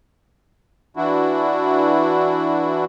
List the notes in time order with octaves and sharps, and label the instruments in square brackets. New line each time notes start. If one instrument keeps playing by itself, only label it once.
[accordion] E3 D4 E4 F#4